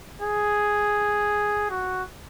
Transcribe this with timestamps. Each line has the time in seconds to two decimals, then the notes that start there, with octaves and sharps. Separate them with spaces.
0.21 G#4
1.70 F#4